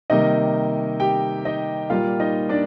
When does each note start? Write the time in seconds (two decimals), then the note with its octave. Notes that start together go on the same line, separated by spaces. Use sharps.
0.10 C3 D#3 G3 A#3 D#4 D#5
1.00 G4 G5
1.45 D#4 D#5
1.90 A#2 G3 A#3 F4 F5
2.20 D#4 D#5
2.49 D4 D5